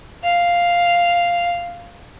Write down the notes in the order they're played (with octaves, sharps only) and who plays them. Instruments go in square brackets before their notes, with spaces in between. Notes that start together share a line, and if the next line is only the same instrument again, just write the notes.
[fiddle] F5